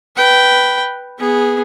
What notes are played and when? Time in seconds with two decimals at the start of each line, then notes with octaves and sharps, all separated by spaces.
0.16 B4 G5
1.19 B3 G#4